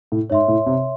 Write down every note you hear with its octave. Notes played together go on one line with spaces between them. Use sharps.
A2
G#2 C#5 E5 C6
A2
C3